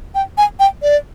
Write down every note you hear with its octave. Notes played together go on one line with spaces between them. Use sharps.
G5
G#5
G5
D5